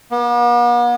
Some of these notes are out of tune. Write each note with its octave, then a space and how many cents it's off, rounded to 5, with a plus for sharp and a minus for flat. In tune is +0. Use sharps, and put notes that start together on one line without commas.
B3 -45